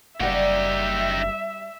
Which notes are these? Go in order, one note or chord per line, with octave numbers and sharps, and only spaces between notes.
F#1 G3 D#4 F#4 G4 E5